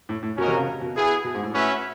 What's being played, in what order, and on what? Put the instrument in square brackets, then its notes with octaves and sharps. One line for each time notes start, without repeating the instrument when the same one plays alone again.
[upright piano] A2
A2
[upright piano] B2 [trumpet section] C#4 F#4 A#4 D#5
[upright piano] C3
C#3
B2
[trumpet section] B3 E4 G#4
[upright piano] B2
G#2
A2
[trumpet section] C#4 F#4 B4 E5